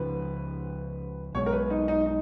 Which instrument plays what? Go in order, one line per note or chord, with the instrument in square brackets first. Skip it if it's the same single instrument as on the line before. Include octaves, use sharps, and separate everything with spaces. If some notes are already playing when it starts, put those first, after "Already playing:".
Already playing: [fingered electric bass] C#2 C#3 F3 [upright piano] B4
[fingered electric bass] B1 B2 G#3 [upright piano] C#5
[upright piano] A#4
B4
D#4
D#4
D#4